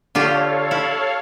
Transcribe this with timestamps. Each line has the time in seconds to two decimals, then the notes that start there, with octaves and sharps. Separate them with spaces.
0.15 D3 F4 G4 A4 C#5 F5
0.71 E4